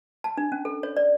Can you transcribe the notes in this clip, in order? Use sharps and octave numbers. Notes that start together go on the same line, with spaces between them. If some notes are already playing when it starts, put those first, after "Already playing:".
A5
D4
C#4
A4
C#5
D5